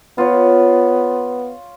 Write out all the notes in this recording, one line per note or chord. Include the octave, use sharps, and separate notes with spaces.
B3 F4 C#5